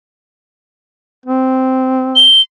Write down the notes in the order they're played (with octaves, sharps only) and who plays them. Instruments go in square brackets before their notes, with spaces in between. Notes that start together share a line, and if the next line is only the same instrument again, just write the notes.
[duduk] C4
[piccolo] G7